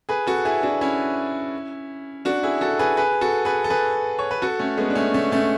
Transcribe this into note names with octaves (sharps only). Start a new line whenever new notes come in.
G#4 B4
F#4 A4
E4 G#4
D4 F#4
C#4 E4
D4 F#4
E4 G#4
F#4 A4
G#4 B4
G#4 B4
F#4 A4
G#4 B4
A4
G#4 B4
C#5
B4
F#4 A4
A3 C#4
G#3 B3
D4
A3 C#4
A3 C#4
A3 C#4